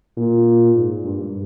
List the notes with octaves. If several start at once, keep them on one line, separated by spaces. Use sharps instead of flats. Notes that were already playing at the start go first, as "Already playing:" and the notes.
A#2
G#2
G2